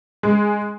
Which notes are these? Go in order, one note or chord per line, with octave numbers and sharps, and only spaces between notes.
G#3